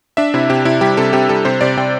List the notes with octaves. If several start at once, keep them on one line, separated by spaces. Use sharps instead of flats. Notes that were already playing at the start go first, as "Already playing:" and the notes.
D4 E5
C3 E4
C3 G4
C3 E4
G3 G4
C3 A4
C3 G4
G3 A4
C3 C5
C3 D5
C3 G5